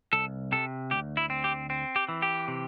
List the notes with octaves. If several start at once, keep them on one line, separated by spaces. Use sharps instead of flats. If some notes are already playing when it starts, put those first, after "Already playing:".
C2 A4
C3 A4
D2 G4
E4
C4
G4
C4
G4
E3
G4
C3